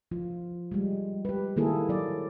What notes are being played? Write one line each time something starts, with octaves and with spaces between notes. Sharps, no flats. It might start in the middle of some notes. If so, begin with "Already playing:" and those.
F3 F4
G3 G#3
G4 B4
D#3 A#3 E4 G#4 A4
F#3 D5